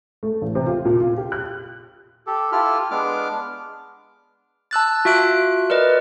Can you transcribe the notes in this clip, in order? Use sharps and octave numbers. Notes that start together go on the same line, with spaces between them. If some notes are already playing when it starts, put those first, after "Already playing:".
A3
A1
C3
F4
A#2
F4
G4
F#6
G4 A4
E4 F4 G4 A4 F6
G#3 B3 D4 D6 F6
A5 E6 F#6 A6
F4 F#4 E5 F#6 D7
A#4 B4 D5 D#5